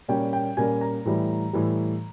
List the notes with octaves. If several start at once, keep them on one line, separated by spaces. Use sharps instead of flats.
A#2 G3 A#3 C#4 G5
G5
A#2 G3 A#3 C#4 G#5
A#5
A2 E3 G3
A2 E3 G3